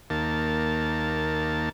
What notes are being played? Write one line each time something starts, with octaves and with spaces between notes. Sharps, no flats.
D#2 A#3 A5